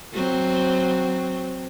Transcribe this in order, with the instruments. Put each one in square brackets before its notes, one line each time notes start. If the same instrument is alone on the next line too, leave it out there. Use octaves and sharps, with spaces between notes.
[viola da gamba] F#3 C4